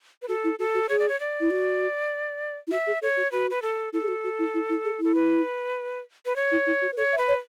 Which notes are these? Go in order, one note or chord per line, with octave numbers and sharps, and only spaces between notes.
B4
F#4 A4
E4
F#4 A4
F#4
G#4 C#5
D5
C#5
D5
E4
F#4
E4
F#4 E5
G#4
A4 C#5
F#4
F#4 B4
B4
A4
E4 A4
G#4
F#4
F#4
E4
E4
E4
G#4
E4 A4
B4
B4
C#5
E4
E4
F#4
B4
A4 C#5
E5
B4
C#5